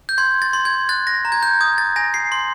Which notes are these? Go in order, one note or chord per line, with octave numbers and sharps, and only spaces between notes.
G6
C6 G#6
A6
C6
G#6
F#6 A6
A#6
A#5
G#6
G6
D#6 G#6
A6
G#5 A#6
C7
C6